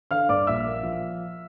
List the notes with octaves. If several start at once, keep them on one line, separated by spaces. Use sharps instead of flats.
D3 F5 F6
G2 D5 D6
A#1 E5 E6
A#3
F3